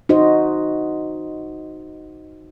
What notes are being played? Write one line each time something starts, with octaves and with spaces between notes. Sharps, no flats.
D#4 F#4 C5 D#5